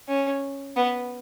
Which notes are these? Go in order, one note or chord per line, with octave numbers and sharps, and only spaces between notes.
C#4
B3